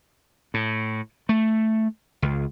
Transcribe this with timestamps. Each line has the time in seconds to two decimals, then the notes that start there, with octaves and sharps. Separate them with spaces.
0.54 A2
1.29 A3
2.22 C#2